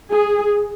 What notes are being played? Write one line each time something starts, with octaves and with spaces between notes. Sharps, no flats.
G#4